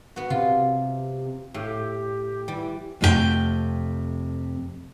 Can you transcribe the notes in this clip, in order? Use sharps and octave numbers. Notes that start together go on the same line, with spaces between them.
B3 F#4
C3 F4
A2 G4
E3 G3
F2 C3 A3 F4 G5